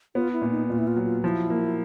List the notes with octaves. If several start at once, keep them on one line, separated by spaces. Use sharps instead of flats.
B3 F4
E4
A#2
D#4
A#2 F4
E4
F4
F#3
F4
F3 E4
A#3